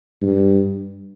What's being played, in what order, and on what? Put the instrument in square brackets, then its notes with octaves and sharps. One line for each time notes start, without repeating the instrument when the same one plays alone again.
[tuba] G2